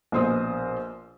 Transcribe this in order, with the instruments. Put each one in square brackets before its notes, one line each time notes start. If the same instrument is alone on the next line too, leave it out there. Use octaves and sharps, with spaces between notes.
[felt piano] A#1 B2 C5 C6 D#6